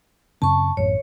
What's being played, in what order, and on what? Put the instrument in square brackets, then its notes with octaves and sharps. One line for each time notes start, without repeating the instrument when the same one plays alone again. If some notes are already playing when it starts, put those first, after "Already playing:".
[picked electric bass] F#2 C#3 C4 [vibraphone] A5 C#6
[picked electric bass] A1 F#2 [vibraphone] C#5